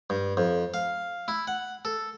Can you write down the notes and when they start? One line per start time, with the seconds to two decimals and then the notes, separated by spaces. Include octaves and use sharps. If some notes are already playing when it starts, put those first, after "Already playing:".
0.10 G2
0.37 F2
0.74 F5
1.28 E4
1.47 F#5
1.85 A4